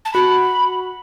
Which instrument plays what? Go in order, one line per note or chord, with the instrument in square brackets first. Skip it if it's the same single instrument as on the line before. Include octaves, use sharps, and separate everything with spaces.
[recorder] A5
[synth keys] F#4 [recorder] B5